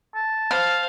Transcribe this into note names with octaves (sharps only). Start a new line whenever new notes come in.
A5
C5 F5 F6